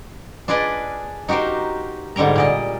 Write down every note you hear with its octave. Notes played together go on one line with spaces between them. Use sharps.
D4 F4 G#4 B4 D5 D#5
D#4 F#4 G4 A#4 C5
G#2 D3 G3 A#4 A#5
A#2 D5 D#5